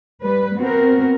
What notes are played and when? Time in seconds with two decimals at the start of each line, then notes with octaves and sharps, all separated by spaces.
0.23 G3 B4
0.58 B3 C4 F#4 A#4